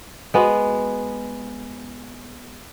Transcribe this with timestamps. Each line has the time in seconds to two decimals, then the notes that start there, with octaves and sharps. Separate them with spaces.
0.34 G#3 B3 F#4